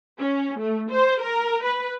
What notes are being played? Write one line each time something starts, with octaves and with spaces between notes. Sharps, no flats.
C#4
A3
C5
A#4
B4